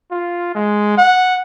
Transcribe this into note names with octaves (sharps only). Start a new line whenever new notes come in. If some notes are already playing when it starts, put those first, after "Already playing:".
F4
G#3
F#5